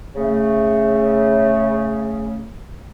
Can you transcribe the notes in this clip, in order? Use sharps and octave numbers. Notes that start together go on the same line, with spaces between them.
C#3 A3